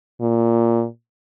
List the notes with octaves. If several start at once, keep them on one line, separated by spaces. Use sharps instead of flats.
A#2